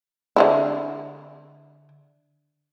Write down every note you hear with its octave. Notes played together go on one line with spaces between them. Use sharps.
D3 D#3 E4